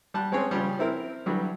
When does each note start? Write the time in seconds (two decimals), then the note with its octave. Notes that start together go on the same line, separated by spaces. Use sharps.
0.14 G3 A5 F#6
0.32 G#3 C4 C#4 G#4 C#5
0.51 C#3 F3 G3
0.79 C4 E4 A#4
1.26 D3 E3 F#3 G3